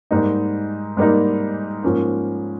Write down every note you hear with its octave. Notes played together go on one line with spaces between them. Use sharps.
G#2 G3 A#3 D#4
G#2 G3 A#3 D#4
G#2 F3 A#3 C#4